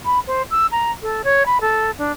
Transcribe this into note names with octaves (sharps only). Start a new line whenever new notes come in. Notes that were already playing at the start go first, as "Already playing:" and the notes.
B5
C5
E6
A#5
A4
C#5
B5
A4
D4